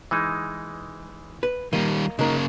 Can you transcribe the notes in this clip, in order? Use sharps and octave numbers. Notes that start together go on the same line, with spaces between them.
E3 G#3 D#4
B4
D#3 G3 A#3 D#5
C#3 G#3 A#3 D#4 A#4